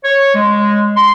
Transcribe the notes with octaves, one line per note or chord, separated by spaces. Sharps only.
C#5
G#3
C6